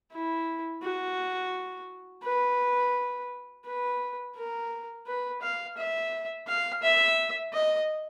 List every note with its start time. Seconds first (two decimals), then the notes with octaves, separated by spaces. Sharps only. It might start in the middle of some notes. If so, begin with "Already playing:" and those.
0.12 E4
0.82 F#4
2.23 B4
3.65 B4
4.36 A#4
5.07 B4
5.42 F5
5.77 E5
6.47 F5
6.82 E5
7.53 D#5